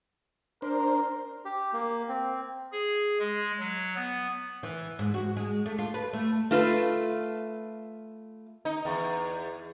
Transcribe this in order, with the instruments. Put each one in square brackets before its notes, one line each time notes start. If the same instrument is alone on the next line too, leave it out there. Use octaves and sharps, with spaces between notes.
[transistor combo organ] D4 C5 [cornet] A#4
[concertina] G4
A#3
C4
[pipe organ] G#4
G#3
F#3
B3
[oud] E3
G#2
F#4
G#3
A3
F4
B4
A3
[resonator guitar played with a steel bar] A3 F4 B4
[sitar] D#4
E2